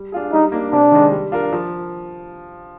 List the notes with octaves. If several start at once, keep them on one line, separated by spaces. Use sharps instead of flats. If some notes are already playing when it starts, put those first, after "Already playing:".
Already playing: G3
D4 F4 G#4
G3 D#4
A#3 D4
C3 D4
D#3 G#3
G3
D4 F4 A#4
F3